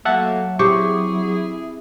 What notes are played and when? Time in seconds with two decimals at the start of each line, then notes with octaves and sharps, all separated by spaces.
0.05 F#3 A3 A#3 E5 F#5 A5
0.59 C4 E4 G4 G#4 C#6